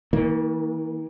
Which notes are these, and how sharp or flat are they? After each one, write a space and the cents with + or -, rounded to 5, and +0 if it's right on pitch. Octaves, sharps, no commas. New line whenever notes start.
E3 -45 A#3 +0